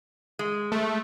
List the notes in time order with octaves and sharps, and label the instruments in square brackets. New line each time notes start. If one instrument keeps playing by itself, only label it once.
[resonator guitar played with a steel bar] G#3
[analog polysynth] A3